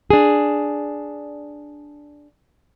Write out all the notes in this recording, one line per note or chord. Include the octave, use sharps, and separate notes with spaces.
D4 G#4